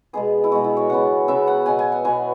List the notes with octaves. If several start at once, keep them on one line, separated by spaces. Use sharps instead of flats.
B2 G#3 B3 G#4
E4
B2 G#3 B3 F#4
E4
C#5
C#3 F#3 B3 F#5
C#3 F#3 B3 E5
F#5
B2 F#3 B3 G#5
G#5
F#5
B2 F#3 B3 G#5